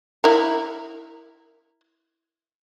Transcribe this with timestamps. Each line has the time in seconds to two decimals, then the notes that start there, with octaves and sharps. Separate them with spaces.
0.24 E4 A#4